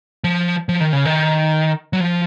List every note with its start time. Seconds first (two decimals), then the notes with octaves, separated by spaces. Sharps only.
0.24 F3
0.69 F3
0.81 D#3
0.93 C#3
1.05 D#3
1.93 F#3
2.00 F3